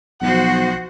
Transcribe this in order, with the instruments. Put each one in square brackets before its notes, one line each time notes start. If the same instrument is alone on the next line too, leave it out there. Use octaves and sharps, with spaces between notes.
[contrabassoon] B1 [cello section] F3 F#4 C5 [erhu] F#5